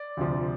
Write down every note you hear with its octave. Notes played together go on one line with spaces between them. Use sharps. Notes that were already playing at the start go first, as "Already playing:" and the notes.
Already playing: D5
D2 C3 F3